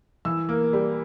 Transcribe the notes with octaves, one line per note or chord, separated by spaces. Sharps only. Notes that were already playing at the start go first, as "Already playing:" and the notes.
E3 E6
A#3
G3